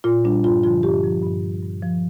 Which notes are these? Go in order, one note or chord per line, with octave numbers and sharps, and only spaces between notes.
A#2 F4
G3 D4
G2 F4
D3 F3 F4
G2 G4
F3
G2
G3
G2
F3